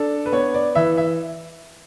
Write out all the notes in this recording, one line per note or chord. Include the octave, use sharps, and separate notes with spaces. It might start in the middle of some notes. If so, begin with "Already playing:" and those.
Already playing: D4 A4
B4
B3 C#5
D5
E3 E5
E5